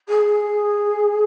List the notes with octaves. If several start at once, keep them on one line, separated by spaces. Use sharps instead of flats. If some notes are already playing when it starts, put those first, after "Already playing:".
G#4